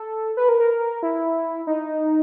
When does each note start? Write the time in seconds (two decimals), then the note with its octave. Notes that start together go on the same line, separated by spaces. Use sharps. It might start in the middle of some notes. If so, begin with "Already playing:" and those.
Already playing: A4
0.37 B4
0.49 A#4
0.60 A#4
1.03 E4
1.67 D#4